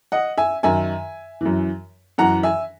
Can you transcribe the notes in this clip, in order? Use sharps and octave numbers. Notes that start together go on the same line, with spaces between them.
D#5 F#5
E5 G#5
F#2 D#3 E5 G#5
F#2 E3
F#2 E3 F#5 A#5
E5 G#5